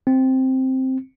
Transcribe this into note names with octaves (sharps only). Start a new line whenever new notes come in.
C4